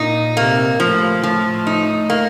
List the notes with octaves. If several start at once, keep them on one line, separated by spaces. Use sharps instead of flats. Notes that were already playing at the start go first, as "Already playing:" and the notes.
Already playing: A#2 D#4
C3 A#3
A2 F3
A2 F3
D#4
A#3